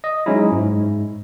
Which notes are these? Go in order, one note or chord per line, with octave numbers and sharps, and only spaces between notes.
D#5
F#3 G#3 C#4 D#4 E4
G#2